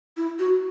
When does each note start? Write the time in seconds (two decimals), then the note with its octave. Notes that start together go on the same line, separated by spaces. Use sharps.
0.17 E4
0.39 F#4